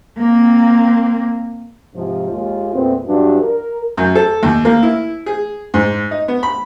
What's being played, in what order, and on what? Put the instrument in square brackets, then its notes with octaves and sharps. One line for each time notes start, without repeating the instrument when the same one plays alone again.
[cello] A#3 C4
[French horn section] G#2 C3 F3
D#2 G#3 F4
E2 A#2 A3 B3 C4
G2 E3 F#3 G3 D4 F#4
A#4
[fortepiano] F#2
A4
D#2
A#3
E4
G#4
G#2
D#4
B3
B5